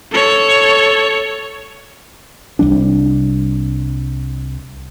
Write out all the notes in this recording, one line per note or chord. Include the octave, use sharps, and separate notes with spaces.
A4 C#5
C2 G3 D4